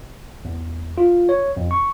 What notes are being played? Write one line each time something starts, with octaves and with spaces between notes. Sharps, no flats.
E2
F4
C#5
F2
C#6